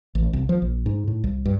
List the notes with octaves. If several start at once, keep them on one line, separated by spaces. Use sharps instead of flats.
A1
C2
F3
A#1
G#2
A2
C2
G2